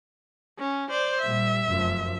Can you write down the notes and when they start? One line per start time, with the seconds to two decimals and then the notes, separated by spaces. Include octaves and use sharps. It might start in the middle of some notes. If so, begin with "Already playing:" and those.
0.59 C#4
0.90 C5 D5
1.21 A#2 G3 E5
1.66 F1 F#2 F3